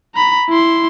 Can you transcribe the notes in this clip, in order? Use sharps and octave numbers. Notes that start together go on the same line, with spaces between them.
A#5 B5
E4 C6